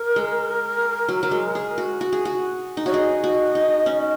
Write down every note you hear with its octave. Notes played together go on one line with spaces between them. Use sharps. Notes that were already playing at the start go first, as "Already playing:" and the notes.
Already playing: A#4
G#3
F#3
F#3
G#3
G#4
F#4
F#4
G#4
F#4
D#4
F#4 C#5
G#4 D#5
F#4
D#4
C#4